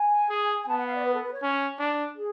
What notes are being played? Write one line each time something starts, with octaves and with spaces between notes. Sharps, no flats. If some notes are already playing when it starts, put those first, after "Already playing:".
Already playing: G#5
G#4
G#5
B3 A5
F#5
F5
D5
B4
A4
B4
C#5
C#4
D4
G#4